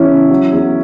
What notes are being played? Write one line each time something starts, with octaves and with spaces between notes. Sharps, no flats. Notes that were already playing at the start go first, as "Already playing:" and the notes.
Already playing: E2 E3 C#4 E4
C#3
F#3
E2